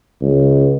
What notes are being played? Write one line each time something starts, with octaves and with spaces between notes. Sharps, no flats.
C#2